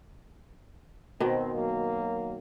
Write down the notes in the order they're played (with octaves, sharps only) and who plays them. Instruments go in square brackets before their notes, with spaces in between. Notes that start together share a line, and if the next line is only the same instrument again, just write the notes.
[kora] B2 D#3 [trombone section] C4
[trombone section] F#3 A#3